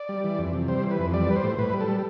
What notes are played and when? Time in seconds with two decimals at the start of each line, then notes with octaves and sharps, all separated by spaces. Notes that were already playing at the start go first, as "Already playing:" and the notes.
Already playing: D5
0.09 G3
0.24 E3
0.39 F2
0.53 C3
0.68 G3 C5
0.83 E3
0.91 B4
0.99 F2
1.13 G3 D5
1.29 G3 B4
1.36 C5
1.43 A2
1.58 A2 B4
1.74 G3
1.81 A4
1.88 G3